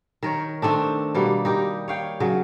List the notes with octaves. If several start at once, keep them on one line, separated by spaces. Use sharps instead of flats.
D#3 A#4 C#5
D#3 A3 C4 D4
B2 G3 A#3
D#4 G4 A#4
C#5 F5 G5
C#3 F#3